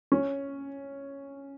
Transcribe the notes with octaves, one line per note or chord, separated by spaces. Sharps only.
C#4